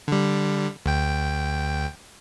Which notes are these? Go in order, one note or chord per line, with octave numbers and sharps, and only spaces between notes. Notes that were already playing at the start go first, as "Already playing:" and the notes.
D3 G3
D2 G5